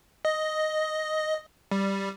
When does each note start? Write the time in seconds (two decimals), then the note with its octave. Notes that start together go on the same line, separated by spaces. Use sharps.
0.25 D#5
1.71 G3